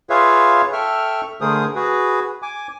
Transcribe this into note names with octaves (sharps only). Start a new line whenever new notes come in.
F4 G#4 B4 C#5 E5 F5
A4 E5 G5 C#6 F6
D3 A3 G#4 A#4 C5 D#6
F#4 G#4 B4
G#5 D6